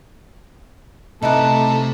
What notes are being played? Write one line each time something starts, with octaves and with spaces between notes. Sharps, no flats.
C3 A3 D#4 E4 B4 A5